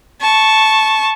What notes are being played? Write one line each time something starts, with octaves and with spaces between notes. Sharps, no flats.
A5 C#6